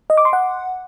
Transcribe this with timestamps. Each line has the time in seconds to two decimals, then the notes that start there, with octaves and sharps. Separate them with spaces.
0.10 D#5
0.17 D6
0.25 C6
0.33 F#5